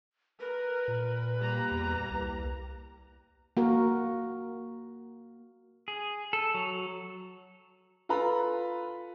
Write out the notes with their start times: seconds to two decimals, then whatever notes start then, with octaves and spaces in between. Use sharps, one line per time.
0.40 A#4 B4
0.88 A#2
1.39 G3 A#3 A#5
1.71 E2
2.11 C2
3.57 A#3 F#4 A#4
5.88 G#4
6.33 A4
6.54 F#3
8.09 F4 A4 B4 A#5 B5